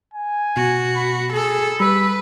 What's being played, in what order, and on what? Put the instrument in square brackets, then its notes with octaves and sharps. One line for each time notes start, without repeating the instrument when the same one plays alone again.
[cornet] G#5
[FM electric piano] B2 [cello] F#4
[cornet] B5
[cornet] G#4 [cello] A4
[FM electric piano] G3 [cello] B4 [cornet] B5 [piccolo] E6